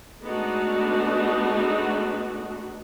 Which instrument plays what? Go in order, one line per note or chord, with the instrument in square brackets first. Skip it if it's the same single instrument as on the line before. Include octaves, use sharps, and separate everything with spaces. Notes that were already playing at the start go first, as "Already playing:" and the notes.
[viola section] G#3 A3 B3 D4 D#4 F#4